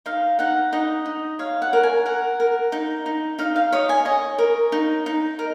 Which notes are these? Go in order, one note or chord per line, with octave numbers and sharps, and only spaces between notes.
D#4 F5
D#4 F#5
D#4 D#5
D#4
C#5 F5
F#5
A#4
G#5
A#4 F#5
A#4
D#4
D#4
D#4 F5
F5
C#5 D#5
G#5
C#5 D#5
A#4
D#4
D#4
A#4